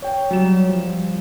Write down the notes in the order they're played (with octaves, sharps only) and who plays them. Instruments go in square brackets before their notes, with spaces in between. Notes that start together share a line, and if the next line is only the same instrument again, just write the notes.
[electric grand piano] C#5 G5
F#3 G3 E7
F3 G3